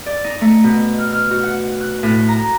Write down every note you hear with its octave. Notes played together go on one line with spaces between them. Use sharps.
D5
D#4
A3
B2
F6
F6
F#4
F#5
F#6
A2
A#5